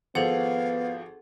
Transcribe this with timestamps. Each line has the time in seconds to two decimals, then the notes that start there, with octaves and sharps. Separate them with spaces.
0.15 G#1 F3 B3 G#4 A4 F5 F#5